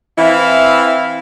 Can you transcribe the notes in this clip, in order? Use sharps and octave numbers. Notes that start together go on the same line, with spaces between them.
E3 C4 E4 E5 F5